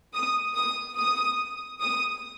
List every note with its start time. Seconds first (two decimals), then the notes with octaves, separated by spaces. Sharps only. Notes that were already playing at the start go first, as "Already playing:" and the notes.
0.13 D#6
0.55 D#6
0.97 D#6
1.82 D#6